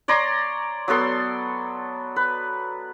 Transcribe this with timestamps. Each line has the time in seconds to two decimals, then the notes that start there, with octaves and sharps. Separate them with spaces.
0.08 C#5 D5 A#5 C6
0.88 F#3 B3 A4 C6
2.16 B4